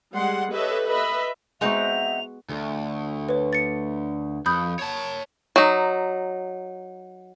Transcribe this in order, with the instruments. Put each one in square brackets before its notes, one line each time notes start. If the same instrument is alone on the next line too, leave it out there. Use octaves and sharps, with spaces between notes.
[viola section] G3 G#3 F#5 C6
G4 A4 B4 C#5 D#5 E5
B4 D#5 E5 B5
[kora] G#3 B3 F#4 [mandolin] C4 D#4 F#5 [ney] E5 [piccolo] F7
[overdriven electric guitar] D2
[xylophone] B4 C#5
A6 C#7
[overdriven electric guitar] F2 [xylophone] B5 D#6 G6
[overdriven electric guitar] C#5 A5
[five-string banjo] F#3 D#4